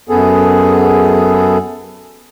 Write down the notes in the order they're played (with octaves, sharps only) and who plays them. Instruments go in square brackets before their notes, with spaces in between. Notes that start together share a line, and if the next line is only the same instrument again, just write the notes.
[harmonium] F#2 B3 G#4 A4